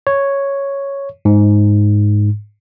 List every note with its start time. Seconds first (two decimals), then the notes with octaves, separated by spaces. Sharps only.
0.07 C#5
1.25 G#2